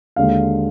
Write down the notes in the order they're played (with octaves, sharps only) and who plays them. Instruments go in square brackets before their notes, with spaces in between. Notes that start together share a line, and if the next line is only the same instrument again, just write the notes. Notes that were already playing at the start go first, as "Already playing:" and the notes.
[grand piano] D#2 D3 G#3 F5